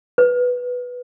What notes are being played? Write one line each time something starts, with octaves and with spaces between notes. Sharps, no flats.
B4